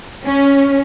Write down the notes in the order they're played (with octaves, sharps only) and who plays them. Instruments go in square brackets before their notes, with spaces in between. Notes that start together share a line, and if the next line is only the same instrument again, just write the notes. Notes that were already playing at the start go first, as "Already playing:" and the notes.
[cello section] C#4